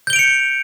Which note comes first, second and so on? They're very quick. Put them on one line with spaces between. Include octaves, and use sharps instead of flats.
G6 G7 D7 F7 C#7